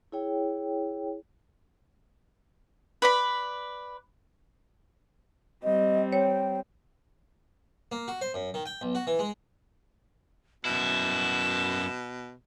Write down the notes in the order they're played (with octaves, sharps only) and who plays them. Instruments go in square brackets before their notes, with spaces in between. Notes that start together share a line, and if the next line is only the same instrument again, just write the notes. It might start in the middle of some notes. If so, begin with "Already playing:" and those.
[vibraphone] E4 G#4 C#5 G5
[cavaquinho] B4 D5 B5
[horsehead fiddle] G3 C4 [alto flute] D#5
[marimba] C#5 [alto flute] G5
[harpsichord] A#3
F#4
C5
F#2
D#3
G5
B1
F#4
E3
G#3
[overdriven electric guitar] F#2 E4 [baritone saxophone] B2 [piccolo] E7